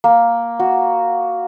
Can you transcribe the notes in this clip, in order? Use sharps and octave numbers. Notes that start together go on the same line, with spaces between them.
A#3
F#4